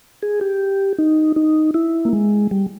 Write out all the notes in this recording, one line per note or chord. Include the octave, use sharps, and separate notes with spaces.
G#4
G4
D#4
D#4
E4
A#3
G#3
G3